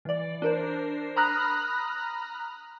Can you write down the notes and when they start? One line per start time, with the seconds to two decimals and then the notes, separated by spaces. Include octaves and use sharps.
0.05 E3 D5
0.42 D4 A#4 C5
1.16 A#5 B5 D#6 F6 F#6 A#6